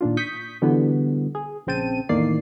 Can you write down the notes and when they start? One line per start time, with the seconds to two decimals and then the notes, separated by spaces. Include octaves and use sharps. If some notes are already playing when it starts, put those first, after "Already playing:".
0.01 A#2 D#3 D4 F4
0.17 C#6 D#6 G6 B6
0.62 B2 D3 E3 G3 B3
1.35 G#4
1.67 A#1 C#3 C4 G5 A5 D#7
2.09 E2 A2 D#3 A#3 D5 C7